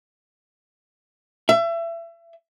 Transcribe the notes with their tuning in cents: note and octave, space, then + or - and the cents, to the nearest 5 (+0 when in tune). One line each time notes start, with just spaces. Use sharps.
E5 +30